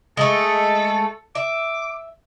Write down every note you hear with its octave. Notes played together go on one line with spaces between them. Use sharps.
G#3 A3 A4
E5 D6